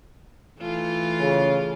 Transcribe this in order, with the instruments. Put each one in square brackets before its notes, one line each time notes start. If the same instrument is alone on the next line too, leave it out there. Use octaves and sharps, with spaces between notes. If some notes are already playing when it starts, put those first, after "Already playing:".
[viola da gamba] E3 A3 F4
[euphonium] C#3